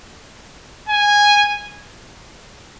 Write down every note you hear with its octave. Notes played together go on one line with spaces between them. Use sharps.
G#5